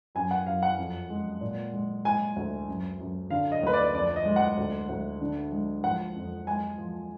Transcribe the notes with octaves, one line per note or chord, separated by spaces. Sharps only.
F#2 G#5
F#5
F#2 F5
F#5
F2
G#3
A#2
G#3
G#3 G#5
D2
F#2
F#2
D3 F5
D#5
D2 B4
D5
F2 D5
D#5
G#3
F#5
D2
D2
D3
G#3
F3 F#5
F2
G#3 G#5
F3